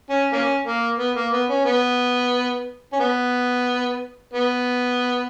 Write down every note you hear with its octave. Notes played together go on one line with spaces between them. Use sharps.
C#4
A#3 C#4
A#3
B3
A#3
B3
C#4
B3
C#4
B3
B3